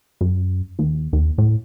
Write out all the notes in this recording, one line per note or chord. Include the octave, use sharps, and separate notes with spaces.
F#2
D#2
D#2
A2